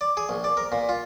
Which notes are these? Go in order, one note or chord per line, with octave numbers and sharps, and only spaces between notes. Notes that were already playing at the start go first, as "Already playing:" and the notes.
D5
G#4
A#1
D5
A#4
A#2
F4